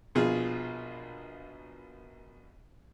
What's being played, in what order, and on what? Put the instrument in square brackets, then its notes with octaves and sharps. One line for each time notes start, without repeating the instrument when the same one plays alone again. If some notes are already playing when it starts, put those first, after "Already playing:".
[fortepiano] A#1 B2 F4 G#4